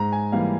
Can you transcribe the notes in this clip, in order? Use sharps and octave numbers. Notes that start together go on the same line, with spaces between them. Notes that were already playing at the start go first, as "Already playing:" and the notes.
Already playing: G#2 A#5
G#5
E3 G3 A#3 F5